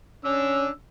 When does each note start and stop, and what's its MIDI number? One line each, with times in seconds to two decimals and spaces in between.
0.25 0.68 61
0.25 0.69 62
0.25 0.69 88